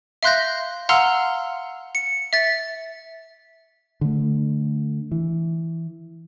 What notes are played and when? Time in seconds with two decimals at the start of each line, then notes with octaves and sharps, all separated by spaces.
0.23 E5 F5 C6 F#6 G6 A#6
0.89 F5 F#5 A#5 C6 E6 F6
1.95 C#7
2.33 E5 A6
4.01 D3 A3
5.12 E3